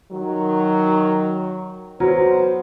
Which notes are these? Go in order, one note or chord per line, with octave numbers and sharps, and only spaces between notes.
D#3 F#3
F#3 B3 C5